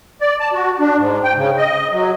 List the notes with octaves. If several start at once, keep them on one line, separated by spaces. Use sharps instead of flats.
D5
A5
F#4
D4
G#2
G5
C#3
D#5
F#3